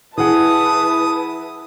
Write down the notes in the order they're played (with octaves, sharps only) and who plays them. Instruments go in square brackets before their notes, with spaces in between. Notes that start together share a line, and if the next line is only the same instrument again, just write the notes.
[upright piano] E3 G#4 F#5 [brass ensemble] E4 [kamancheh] B4 A5 [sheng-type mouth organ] D#6